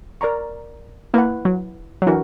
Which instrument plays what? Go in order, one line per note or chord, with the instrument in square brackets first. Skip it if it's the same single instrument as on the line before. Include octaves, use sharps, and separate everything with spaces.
[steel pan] A#4 D5 A#5 C#6
[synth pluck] A#3 [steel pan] E4 B4 F#5
[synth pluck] F#3
F#3
[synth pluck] E3 [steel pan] D4 F#4 A#4